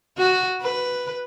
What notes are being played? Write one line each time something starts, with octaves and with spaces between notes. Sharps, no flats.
F#4
B4